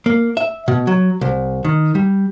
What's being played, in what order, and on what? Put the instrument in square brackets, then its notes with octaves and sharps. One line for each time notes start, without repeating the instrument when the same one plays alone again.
[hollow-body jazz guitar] A#3
E5
B2
F#3
C2
D#3
G3